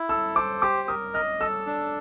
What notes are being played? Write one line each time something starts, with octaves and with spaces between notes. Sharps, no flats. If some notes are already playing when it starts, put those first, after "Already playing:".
Already playing: E4
A4 E6
C5 D6
G4 D6
A#4 D#6
D#5 F6
A4 E6
D4